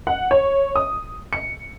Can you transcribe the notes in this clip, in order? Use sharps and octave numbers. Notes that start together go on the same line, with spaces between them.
F#5
C#5
D#6
C#7